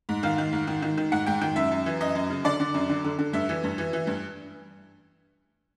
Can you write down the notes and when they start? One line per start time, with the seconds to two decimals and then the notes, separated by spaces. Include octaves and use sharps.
0.09 G#2
0.23 D#3 F5
0.38 D#3
0.53 G#2
0.67 D#3
0.82 D#3
0.97 D#3
1.12 G#2 F#5
1.27 G#2 G5
1.41 D#3 G5
1.56 F#2 E5
1.71 F#2
1.86 E3
2.01 F#2 D#5
2.15 F#2
2.30 C#3
2.44 D3 D5
2.60 D3
2.74 F#2
2.90 D3
3.04 D3
3.19 D3
3.33 G2 E5
3.49 E3
3.64 G2
3.78 E3
3.93 E3
4.07 G2